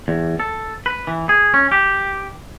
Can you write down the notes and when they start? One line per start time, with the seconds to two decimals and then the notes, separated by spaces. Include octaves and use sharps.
0.08 E2
0.40 A4
0.86 B4
1.07 E3
1.29 G#4
1.54 C#4
1.71 G4